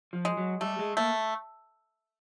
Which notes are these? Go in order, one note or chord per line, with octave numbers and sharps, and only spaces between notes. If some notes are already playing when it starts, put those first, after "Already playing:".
F3
G#3
F#3
G3 A3
G#3
A3 A#3